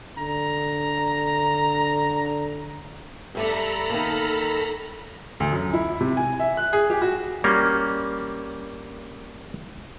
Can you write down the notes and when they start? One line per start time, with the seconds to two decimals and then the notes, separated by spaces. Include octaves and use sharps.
0.18 D3 A#5
3.35 G2 A3 D4 A4 A#5 B5
3.90 D#3 A#3
5.40 D2
5.52 F#2
5.73 E4
6.00 C3
6.17 G#5
6.40 E5
6.57 F#6
6.73 G#4
6.90 G4
7.02 F#4
7.44 G3 A#3 C#4